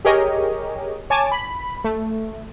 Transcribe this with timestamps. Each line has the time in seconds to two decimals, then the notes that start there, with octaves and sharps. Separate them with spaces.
0.05 G4 G#4 A#4 C#5 D#5
1.10 C#5 G#5 A5 D6
1.32 B5
1.84 A3